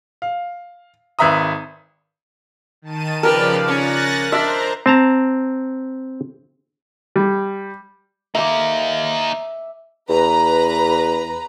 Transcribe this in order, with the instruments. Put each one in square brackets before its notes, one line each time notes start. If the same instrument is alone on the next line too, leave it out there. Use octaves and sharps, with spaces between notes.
[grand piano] F5
G#1 B4 E5 A#5 D#6
[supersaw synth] D#3 A5 D#7
[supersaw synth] C#3 F3 D5 [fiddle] G4 B4 [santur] A#4
[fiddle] C#4 [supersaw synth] F#6 A6 A#6
[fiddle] D4 [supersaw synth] C5 A#5 [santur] E5
[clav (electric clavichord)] C4 A5 A#5
[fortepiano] G3
[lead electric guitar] A#3 D#4 [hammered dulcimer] E5 D6
[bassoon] E2 [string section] B4 A#5